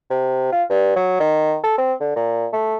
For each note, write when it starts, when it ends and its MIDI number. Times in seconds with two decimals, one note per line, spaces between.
0.10 0.48 48
0.52 0.63 65
0.70 0.92 43
0.96 1.17 54
1.20 1.58 51
1.64 1.77 69
1.78 1.94 60
2.00 2.14 50
2.16 2.48 46
2.53 2.76 57